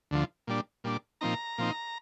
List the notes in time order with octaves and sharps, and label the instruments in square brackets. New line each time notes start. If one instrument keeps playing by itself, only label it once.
[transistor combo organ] D2 D3 F3
A#2 G3 D4
A#2 G3 D4
A#2 F3 C4 D#4 A#5
A#2 F3 C4 D#4